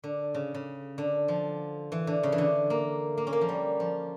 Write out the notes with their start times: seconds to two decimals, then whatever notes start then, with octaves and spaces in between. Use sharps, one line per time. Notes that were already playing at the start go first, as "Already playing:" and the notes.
0.04 D3
0.34 C#3
0.54 C#3
0.98 D3
1.28 F3
1.92 E3
2.07 D3
2.23 C#3
2.32 E3
2.38 D3
2.70 A#3
3.18 A#3
3.27 C#4
3.33 A#3
3.41 F3
3.49 G3
3.80 F3